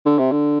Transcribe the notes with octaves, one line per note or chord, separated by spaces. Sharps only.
D3
C3
D3